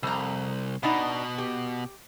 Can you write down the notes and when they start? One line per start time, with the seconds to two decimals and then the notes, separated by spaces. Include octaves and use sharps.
0.03 C2 F2 A#5
0.83 B2 B3 D4 D#4
1.38 G4